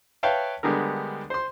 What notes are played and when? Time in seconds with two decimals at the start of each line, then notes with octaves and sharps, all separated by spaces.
0.23 B4 C#5 E5 F5 G5 A5
0.63 D3 G3 G#3 B3 A#4
1.30 C5 C6